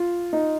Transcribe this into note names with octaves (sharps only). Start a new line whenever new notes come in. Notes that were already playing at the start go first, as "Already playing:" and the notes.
Already playing: F4
D#4